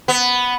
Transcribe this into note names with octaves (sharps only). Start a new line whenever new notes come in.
B3